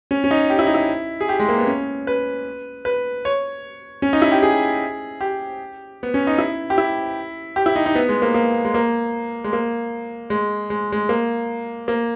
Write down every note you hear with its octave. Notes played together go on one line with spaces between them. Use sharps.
C#4
C#4
D#4
G4
E4
D#4
E4
G#4
G4
G#3
A#3
B3
C#4
B4
B4
C#5
C#4
D#4
E4
G4
G#4
G4
B3
C#4
D#4
E4
G4
E4
G4
E4
D#4
D#4
B3
G#3
A#3
A#3
G#3
A#3
G#3
A#3
G#3
G#3
G#3
A#3
A#3